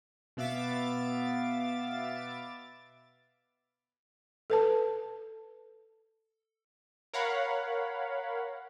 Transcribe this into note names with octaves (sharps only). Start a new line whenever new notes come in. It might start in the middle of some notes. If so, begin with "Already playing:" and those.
B2 B3 E5 F5 D6 A6
A4 B4 A5
A#4 C#5 F5 F#5 B5